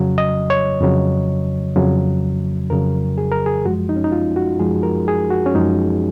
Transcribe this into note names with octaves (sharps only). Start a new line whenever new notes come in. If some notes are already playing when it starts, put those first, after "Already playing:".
Already playing: F2 C#3 F#3
D#5
C#5
F2 C#3 F#3
F2 C#3 F#3
F2 C#3 F#3 A#4
G#4
A#4
G#4
F#2 F3 G#3 F#4
D#4
C#4
D#4
F4
F#4
F#2 F3 G#3 G#4
A#4
G#4
F#4
C#4
F#2 F3 G#3 D#4